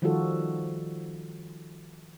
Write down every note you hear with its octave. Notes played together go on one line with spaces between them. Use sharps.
D#3 F3 G3 F4 F#4 A4